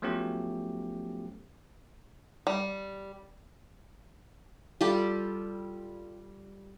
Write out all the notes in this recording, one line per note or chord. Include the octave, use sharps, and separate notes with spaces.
F3 F#3 A3 B3 C#4 G4
G3
G3 F4 G4 A4